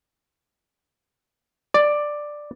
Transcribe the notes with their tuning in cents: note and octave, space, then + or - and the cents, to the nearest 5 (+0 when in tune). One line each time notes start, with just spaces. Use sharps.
D5 +5